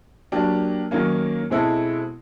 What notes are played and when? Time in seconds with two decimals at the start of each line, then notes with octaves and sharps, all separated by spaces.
0.32 F#3 A#3 D4 G4
0.91 D#3 F#3 A#3 C#4
1.50 B2 G#3 C4 E4 A4